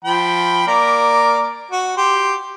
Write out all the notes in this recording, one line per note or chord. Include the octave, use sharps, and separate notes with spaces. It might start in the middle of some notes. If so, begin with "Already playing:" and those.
F3 G5 B5
A#3 A#4 D5
F#4
G4 C6